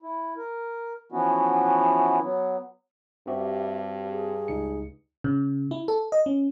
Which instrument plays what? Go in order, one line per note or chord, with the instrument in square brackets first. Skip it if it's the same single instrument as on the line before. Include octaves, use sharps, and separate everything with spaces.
[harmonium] E4
A#4
E3 F3 B3 C#4 E4 F#4
F#3 B3
[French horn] G2 [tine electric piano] C4 F#4 G4 [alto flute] E5
[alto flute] G#4
[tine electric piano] C#2 D#4 C#7
[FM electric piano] C#3
E4
A4
D#5
C#4